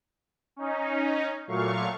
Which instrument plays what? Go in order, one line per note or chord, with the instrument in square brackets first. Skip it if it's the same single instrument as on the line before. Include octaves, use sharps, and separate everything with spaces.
[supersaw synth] C#4 D#4
A#2 F#3 A3 F5 C#6